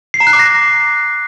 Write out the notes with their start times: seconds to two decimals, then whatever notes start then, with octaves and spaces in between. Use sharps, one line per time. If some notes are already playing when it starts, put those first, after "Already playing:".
0.14 C7
0.20 A#5
0.27 F#6
0.33 D6
0.39 A#6